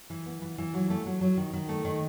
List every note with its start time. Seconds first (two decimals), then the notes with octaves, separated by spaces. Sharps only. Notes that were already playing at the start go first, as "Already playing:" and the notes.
0.10 E3
0.26 B3
0.41 E3
0.58 E3
0.74 F#3
0.90 A3
1.06 F#3
1.21 F#3
1.37 D#3
1.53 D#3
1.69 A3
1.85 D#3